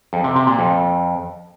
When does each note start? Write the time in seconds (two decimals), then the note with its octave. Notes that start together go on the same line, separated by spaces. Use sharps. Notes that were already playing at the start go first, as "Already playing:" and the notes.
0.13 F2
0.24 C3
0.36 C3
0.47 A#2
0.59 F2